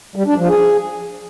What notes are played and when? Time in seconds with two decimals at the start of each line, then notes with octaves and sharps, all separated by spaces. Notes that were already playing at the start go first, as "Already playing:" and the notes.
0.16 G3
0.27 D4
0.38 F3
0.49 G#4